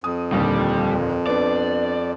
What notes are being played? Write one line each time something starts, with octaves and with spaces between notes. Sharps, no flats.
F2 D#6
D#2 A#2 D3 G3
B3 D4 D5